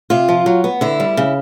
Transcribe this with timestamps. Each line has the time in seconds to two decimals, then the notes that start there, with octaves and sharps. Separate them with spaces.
0.10 C3 F4
0.28 F3
0.46 F#3
0.64 B3
0.81 D3 E4
1.00 G3
1.17 C#3